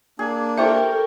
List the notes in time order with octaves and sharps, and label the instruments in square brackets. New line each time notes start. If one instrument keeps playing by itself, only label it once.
[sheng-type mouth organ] A#3 D4 [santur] G#4
[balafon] E4 C5 E5 [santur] G4 C#6 [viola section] A4 A#4